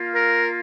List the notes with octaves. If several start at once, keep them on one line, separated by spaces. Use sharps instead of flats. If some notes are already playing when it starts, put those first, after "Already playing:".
Already playing: A#3 F4
A#4